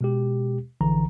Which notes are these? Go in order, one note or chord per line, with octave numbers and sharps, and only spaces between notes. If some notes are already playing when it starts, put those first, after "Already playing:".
B2 G#3 G4
A#1 D3 E3 A#5